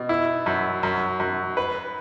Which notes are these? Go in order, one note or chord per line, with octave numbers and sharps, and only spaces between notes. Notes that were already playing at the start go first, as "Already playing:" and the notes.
Already playing: B2
E4
F#2
F#2
F#2
B4